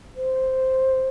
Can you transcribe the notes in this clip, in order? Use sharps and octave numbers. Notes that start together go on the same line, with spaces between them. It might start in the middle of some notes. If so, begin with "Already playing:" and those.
C5